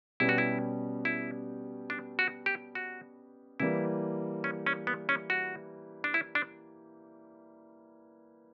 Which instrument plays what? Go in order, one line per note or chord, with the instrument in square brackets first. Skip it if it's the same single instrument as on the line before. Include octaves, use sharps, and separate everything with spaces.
[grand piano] B2 G3 C#4 G4 B4 [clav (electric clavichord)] E4
[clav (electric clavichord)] F#4
E4
E4
D4
F#4
G4
F#4
[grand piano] E3 G3 A#3 [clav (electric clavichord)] E4
[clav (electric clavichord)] C#4
C#4
B3
C#4
F#4
D4
E4
D4